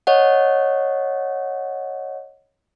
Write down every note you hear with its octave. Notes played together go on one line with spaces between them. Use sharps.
C#5 D#5 F#5